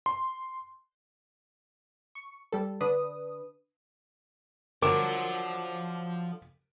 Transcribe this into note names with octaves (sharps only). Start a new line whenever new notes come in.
C6
C#6
G3 A4
D3 D4 B4 D#6
D3 F3 F#3 A#4 C5 D6